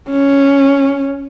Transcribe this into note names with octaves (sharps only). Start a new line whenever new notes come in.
C#4